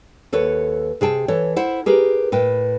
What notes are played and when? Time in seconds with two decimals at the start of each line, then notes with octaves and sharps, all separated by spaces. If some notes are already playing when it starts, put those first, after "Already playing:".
0.32 D#2 A4 B4 C#5
1.01 C3 G#4 G5 A5
1.28 E3 A4 C#5
1.56 E4 C5 F#5
1.86 G4 G#4 A#4 B4
2.32 A2 B4 G5